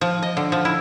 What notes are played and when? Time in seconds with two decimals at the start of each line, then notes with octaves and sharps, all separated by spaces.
0.01 F3
0.22 D#5
0.37 D3
0.52 F3
0.65 E4